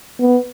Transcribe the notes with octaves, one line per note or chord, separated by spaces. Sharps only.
B3